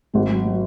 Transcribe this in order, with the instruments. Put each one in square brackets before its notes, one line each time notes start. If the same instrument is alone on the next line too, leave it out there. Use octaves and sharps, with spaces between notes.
[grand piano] G#1 [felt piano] G#3
[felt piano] F#3
F#3